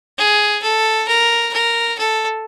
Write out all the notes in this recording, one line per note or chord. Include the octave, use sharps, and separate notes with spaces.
G#4
A4
A#4
A#4
A4